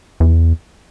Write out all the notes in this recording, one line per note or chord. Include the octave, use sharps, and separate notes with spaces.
E2